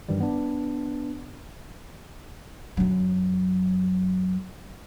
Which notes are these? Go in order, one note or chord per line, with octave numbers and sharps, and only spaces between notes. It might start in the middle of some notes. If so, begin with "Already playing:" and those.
G2 D#3 E3 G3
B3 D4
F#2 F#3